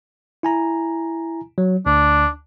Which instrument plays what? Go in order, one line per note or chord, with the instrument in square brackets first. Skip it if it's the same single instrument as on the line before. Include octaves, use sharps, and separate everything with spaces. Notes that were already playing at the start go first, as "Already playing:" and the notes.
[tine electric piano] E4 G#5 A#5
F#3
[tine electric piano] D2 [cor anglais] D4